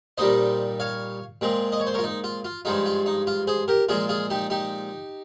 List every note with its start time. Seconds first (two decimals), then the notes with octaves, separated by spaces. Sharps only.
0.18 A#2 G3 A#3 D#4 C5 D#5
0.80 C#5 F5
1.41 A#2 G#3 C4
1.72 D#5
1.80 C#5
1.87 C5
1.94 A#4 C#5
1.99 F4
2.04 D#4
2.24 F4
2.45 F4
2.65 G2 F3 G#3 D#4 F4
2.86 F4
3.06 D#4
3.27 F4
3.47 G#4 C5
3.68 G4 A#4
3.89 A#2 F3 G#3 F4 G#4
4.09 F4 G#4
4.30 D#4 G4
4.50 D#4 G4